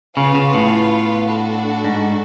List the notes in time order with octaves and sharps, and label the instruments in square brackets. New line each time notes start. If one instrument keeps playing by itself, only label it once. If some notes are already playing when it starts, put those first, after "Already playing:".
[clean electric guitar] C#3 [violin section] B3 F4 B4 F5
[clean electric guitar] C#3
A2
[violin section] D4 F#4 A4
[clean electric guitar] G#2